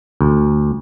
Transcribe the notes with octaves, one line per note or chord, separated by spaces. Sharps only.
D2